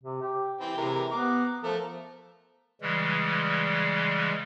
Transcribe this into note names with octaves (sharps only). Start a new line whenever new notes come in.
C3
G4
E3 C4 G5
C3 E3 G#3 A#4
B3 A#5 D6
F3 A3 A4 A#4
C#3 E3 G3 G#3